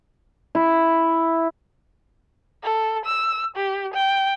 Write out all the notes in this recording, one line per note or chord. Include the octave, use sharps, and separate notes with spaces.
E4
A4
E6
G4
G5